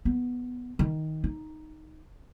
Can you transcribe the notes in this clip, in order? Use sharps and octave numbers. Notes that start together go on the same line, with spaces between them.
B3
D#3
D#4